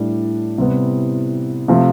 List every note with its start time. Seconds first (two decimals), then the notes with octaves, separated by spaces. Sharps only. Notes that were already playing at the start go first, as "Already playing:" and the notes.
Already playing: A2 G3 D4
0.58 C3 G3 B3
1.68 C3 F3 A3